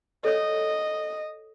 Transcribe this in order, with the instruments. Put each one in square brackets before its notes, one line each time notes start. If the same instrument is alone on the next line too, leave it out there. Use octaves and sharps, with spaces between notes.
[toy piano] A4 C#5 D#6 [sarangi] D#5